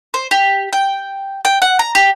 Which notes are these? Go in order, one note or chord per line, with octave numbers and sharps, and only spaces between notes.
C5
G4
G5
G5
F#5
A#5
G4